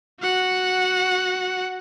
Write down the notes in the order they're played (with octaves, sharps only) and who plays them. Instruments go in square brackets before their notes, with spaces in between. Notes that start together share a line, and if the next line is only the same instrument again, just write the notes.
[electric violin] F#4 F#5